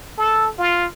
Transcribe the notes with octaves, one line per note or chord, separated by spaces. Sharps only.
A4
F4